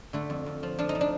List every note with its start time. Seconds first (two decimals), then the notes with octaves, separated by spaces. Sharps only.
0.13 D3 A3
0.30 F2
0.46 F2
0.63 F3
0.79 F3 D4
0.89 D#4
0.95 F3
1.01 D4